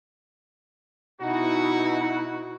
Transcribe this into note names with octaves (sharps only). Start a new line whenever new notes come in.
B2 D#4 E4 F#4